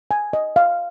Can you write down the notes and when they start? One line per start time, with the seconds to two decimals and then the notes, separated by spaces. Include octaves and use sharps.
0.11 G#5
0.33 D#5
0.56 F5